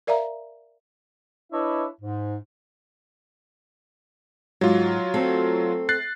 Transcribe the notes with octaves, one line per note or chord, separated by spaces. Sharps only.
A#4 D5 E5 F5 A#5
D4 E4 B4 C#5 D#5 E5
G#2
G#2 F#3 F4
A3 C4 A4
F#6 A6 C7